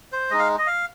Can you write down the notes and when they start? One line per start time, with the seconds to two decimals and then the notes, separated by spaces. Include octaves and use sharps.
0.12 C5
0.30 G#3 D#4 D#5
0.39 F5
0.58 D#5
0.67 F5